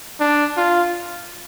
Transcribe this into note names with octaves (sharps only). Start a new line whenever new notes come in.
D4
F4